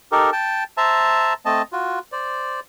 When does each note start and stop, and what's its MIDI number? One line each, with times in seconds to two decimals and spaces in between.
0.12 0.30 63
0.12 0.30 67
0.12 0.30 69
0.12 0.30 70
0.32 0.64 79
0.32 0.64 81
0.77 1.33 72
0.77 1.33 76
0.77 1.33 81
0.77 1.33 82
1.45 1.62 57
1.45 1.62 60
1.45 1.62 75
1.45 1.62 81
1.72 1.99 65
1.72 1.99 66
2.12 2.60 72
2.12 2.60 74